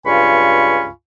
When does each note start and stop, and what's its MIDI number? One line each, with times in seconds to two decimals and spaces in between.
0.05 0.87 37
0.05 0.87 43
0.05 0.87 65
0.05 0.87 80
0.05 0.87 83
0.05 0.87 85